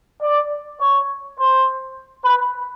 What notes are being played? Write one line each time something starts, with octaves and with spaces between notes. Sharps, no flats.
D5
C#5
C5
B4